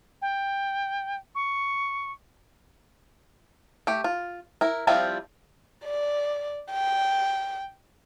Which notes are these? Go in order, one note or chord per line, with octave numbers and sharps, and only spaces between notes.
G5
C#6
A3 G4
F4
E4 A#4
F3 G3 C4 E4 F4
D5
G5